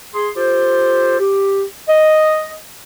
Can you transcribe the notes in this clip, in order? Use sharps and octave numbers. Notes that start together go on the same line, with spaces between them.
G#4 C6
F4 G4 A4 C5
G4
D#5